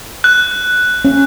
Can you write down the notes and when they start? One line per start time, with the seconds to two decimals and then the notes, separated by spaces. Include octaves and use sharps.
0.24 F#6
1.05 C#4